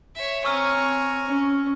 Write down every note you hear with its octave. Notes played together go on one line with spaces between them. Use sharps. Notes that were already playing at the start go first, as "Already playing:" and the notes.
C#5 E5
C4 C#5 G#5 A#5 C#6 E6 F6
C#4